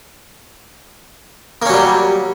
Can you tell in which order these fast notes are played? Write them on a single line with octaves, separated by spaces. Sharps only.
A#3 C#4 F#3 G3